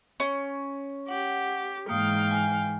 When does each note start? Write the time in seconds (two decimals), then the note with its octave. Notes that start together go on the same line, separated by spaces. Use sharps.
0.20 C#4
1.09 G4 F#5
1.89 G#2 E3 A#3 F5 G5 D#6
2.31 G#5